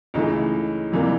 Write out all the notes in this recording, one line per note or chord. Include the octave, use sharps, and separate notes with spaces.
C#2 C#3 E3 A3 D#4
F2 C3 E3 G3 A#3